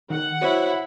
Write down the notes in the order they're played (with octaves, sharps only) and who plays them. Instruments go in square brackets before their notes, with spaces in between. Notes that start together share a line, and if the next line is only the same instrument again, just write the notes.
[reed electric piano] D#3 [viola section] F#5
[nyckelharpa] E4 [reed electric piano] F#4 C5 C#5